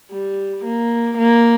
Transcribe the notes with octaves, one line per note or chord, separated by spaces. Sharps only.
G3
A#3
A#3